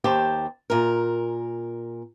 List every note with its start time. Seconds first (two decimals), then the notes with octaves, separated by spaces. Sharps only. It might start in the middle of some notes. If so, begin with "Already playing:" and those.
0.04 D#2 G4 C5 A5
0.70 A#2 A#4